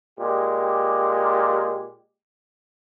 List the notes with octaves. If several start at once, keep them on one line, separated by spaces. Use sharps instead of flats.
A#2 G#3 G4